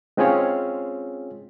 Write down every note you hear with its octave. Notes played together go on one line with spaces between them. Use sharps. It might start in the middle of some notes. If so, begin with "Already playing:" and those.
G#3 C4 C#4 F4 G#4 C#5